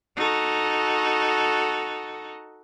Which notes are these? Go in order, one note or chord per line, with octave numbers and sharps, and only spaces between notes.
D#4 F#4 A4